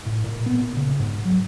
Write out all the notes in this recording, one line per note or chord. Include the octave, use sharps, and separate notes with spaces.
A2
A#2
B3
A#2
C#3
G#2
F#3